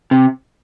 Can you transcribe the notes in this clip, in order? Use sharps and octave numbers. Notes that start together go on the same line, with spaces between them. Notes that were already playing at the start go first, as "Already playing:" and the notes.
C3